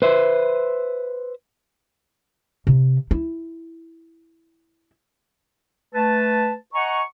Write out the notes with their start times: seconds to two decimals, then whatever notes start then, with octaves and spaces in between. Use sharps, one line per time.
0.02 B4 C5 E5
2.67 C3
3.11 E4
5.94 A3 B4 A5
6.74 D#5 F#5 G#5 A#5 C#6